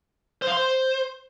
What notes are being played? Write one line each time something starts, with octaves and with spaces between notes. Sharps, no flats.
C5
F5
C6
C5